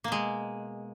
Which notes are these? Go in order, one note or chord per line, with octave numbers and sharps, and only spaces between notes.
B2 G#3 A#3